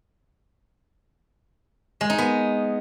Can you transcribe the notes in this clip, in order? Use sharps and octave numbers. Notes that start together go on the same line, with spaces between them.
G#3
D#4
B3